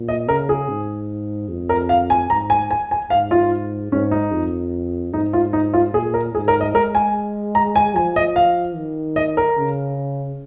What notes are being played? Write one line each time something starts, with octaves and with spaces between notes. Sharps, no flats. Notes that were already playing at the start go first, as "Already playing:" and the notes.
Already playing: A#2
D#5
C#3 A#4
G#4
G#2
F2
A#4
F5
G#5
G#2 A#5
G#5
G#5
G#5
G#2 F5
F4
G#2 C#4
D#4
F2
G#2 D#4
F4
D#4
F4
A#2 G#4
A#4
G#2 G#4
A#4
D#5
G#3 A#4
G#5
A#5
G#5
F3 G#5
D#5
F5
D#3
D#5
A#4
C#3